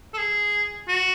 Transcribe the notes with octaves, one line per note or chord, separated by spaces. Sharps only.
A4
G#4
F#4